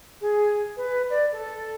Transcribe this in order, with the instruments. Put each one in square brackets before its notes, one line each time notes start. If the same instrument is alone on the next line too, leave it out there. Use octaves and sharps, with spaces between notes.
[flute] G#4
B4
D5
A4